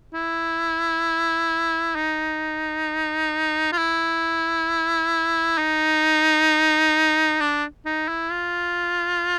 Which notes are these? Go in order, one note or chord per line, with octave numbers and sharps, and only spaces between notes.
E4
D#4
F4
E4
D#4
D4
D#4
E4
F4